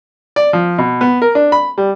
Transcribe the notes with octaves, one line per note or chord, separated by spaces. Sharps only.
D5
F3
B2
B3
A#4
D4
B5
G3